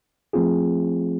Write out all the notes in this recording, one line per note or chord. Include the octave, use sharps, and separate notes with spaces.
F3 A3 C4 F4 G#4